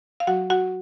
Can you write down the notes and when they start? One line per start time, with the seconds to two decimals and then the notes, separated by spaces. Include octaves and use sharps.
0.20 F5
0.27 F#3 F#4 F#5
0.50 F#4 F#5